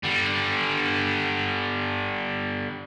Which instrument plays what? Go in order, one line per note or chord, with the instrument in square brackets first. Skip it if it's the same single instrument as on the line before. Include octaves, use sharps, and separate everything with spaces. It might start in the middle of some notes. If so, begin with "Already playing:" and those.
[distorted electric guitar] D3 G3